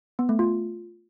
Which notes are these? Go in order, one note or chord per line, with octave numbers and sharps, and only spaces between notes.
B3
A3
F4